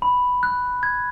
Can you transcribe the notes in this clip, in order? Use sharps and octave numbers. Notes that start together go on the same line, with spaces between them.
B5
F#6
G#6